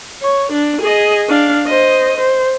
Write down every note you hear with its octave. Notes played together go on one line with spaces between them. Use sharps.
C#5
D4
G#4 D#5
D4 F5
C5 D#5
C5